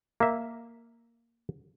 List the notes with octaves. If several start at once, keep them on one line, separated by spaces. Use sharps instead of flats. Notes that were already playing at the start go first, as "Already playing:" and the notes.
A#3 E5